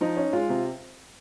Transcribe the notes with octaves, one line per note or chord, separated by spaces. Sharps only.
F3 D#4
C#4
G#3 F4
C3